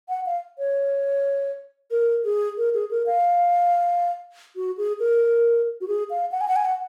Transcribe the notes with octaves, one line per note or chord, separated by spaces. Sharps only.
F#5
F5
C#5
A#4
G#4
A#4
G#4
A#4
F5
F#4
G#4
A#4
F#4
G#4
F5
F#5
G#5
F#5
G#5
F#5